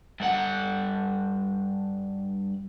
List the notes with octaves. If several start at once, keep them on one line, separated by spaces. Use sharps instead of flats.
G2 F#5